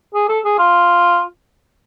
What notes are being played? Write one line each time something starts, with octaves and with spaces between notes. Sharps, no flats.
G#4
A4
G#4
F4